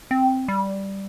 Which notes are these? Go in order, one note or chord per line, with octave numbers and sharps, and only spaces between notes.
C4
G3